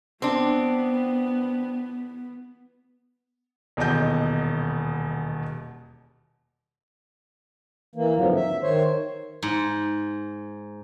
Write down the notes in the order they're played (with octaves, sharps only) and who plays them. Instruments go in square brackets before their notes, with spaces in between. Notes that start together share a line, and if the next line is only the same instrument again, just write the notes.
[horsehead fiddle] B3 [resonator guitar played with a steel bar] C4 D4
[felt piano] D#1 E2 B2 D#5 G6
[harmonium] E3 A#3
F2 G#2 D3 F3 F#3
E5
D#3 C5 C#5
[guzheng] G#2